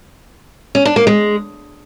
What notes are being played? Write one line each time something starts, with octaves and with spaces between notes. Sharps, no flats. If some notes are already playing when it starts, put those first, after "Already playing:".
C#4
D4
A#3
G#3